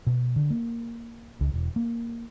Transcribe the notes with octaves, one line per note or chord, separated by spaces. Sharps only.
B2
D3
A#3
C#2
E1
A#3